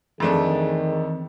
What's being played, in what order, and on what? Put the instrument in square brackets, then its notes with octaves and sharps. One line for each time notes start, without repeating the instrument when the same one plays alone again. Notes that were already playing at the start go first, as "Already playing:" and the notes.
[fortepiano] F2 A3 D4 [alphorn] D#3 [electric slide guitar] E3 C4 [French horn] G#4